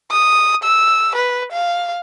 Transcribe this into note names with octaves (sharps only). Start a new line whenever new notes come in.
D#6
E6
B4
F5